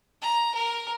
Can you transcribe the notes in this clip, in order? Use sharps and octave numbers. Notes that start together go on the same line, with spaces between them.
A#5
A#4